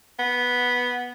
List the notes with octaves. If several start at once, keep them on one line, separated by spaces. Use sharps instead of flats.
B3